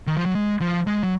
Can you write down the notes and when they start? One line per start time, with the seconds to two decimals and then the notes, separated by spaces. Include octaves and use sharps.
0.07 D#3
0.17 F3
0.26 F#3
0.35 G#3
0.61 F3
0.87 G#3
1.03 F#3